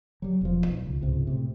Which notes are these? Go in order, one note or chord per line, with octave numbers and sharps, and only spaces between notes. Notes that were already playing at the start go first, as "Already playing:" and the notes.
F#3 G3
E1 F3
B1
C#2
C#2 G#2 C3
A2 C3